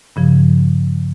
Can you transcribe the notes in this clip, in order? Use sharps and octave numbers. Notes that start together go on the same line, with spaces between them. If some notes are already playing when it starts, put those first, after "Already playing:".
G2 C#3 F3